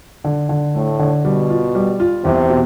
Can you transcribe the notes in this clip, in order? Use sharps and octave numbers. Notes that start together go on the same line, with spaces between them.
D3
D3
A2 A3
D3
B2 G3
F4
G3
F4
E2 C3
B2